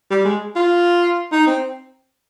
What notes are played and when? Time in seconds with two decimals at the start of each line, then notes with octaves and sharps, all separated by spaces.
0.10 G3
0.25 G#3
0.56 F4
1.32 D#4
1.47 C4